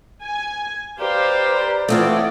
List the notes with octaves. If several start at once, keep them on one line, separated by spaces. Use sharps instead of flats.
G#5
G4 B4 C5 D5 F5 A#5
E3 A3 C4 F4 C#5 D5 F#5 D#6